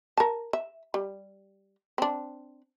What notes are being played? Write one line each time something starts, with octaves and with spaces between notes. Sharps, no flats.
A#4 A5
E5
G3
C4 D4